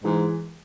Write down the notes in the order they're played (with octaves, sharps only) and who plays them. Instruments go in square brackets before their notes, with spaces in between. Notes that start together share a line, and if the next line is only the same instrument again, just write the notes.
[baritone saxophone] G#2 [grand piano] E3 G#3